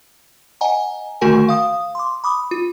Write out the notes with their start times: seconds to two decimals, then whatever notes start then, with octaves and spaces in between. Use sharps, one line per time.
0.61 D#5 F#5 G#5 A#5
1.21 D3 D#3 A3 F#4 A#4 G#5
1.49 F5 D#6
1.95 C6 D6
2.24 B5 D6 D#6
2.51 F4